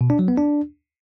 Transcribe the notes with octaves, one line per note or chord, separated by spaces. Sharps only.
B2
D4
F#3
B3
D4